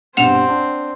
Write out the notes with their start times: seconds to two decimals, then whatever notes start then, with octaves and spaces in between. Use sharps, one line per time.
0.17 G2 B2 G3 C4 F#5 E7 F7
0.49 D4